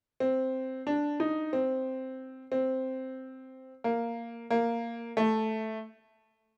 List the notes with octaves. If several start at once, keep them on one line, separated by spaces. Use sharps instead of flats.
C4
D4
D#4
C4
C4
A#3
A#3
A3